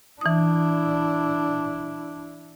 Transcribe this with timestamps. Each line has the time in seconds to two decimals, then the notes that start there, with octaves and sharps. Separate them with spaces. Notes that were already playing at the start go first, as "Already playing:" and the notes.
0.21 E3 D4 E4 D#6